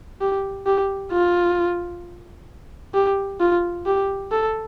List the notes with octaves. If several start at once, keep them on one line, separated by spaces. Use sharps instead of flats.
G4
G4
F4
G4
F4
G4
A4